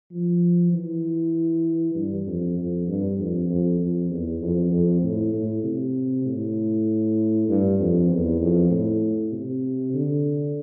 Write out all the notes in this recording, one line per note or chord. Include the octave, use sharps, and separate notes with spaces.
F3
E3
G2
F2
F2
G2
F2
F2
F2
E2
F2
F2
A2
A2
C3
A2
G2
F2
E2
F2
A2
C3
D3